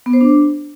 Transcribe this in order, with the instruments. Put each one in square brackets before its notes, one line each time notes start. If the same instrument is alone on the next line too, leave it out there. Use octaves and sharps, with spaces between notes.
[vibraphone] B3
C5
D4